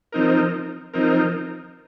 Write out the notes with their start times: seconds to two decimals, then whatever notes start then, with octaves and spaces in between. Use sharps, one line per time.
0.12 F3 C4 D#4 A#4
0.94 F3 C4 D#4 A#4